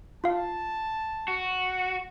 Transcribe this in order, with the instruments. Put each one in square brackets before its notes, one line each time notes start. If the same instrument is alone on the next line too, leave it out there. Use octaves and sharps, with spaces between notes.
[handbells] F4 F5 [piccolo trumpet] A5
[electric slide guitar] F#4